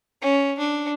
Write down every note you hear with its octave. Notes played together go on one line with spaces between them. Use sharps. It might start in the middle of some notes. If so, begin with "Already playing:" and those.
C#4
D4